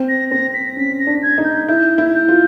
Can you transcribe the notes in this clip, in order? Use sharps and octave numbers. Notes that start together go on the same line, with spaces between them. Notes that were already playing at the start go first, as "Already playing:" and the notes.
Already playing: C4
A#6
C4 A#6
B6
C#4 B6
A#6
D4
G#6
D#4
G6
E4 G6
E4
G6
F4